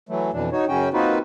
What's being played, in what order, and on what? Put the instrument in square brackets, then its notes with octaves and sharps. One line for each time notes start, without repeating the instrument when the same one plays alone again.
[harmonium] E3 F#3 A3
F2 B2 E3 D4
D#4 F#4 C#5
F#2 C#3 C#4 F#4 G5
A#3 C4 D#4 F4 F#4 B4